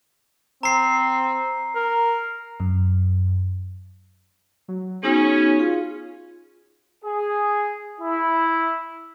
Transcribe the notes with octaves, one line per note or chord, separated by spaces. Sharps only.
C4 A#5 C7
A#4
F#2
F#3
B3 C#4 D#4 F#4 G#4
F4 G#4
G#4
E4